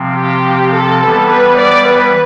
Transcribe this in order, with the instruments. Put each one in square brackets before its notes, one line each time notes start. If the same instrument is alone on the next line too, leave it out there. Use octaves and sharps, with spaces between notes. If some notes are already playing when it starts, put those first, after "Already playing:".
Already playing: [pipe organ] C3 F3 C4
[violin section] G4
A4
[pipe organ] E3 G3 B3
[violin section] B4
D5
B4